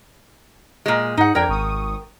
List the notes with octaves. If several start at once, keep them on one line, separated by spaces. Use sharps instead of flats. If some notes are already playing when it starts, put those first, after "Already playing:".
A#2 G#3
G#2 D#4 F#5
F2 D4 A#4 G5 G#6
G#1 C#6 D#6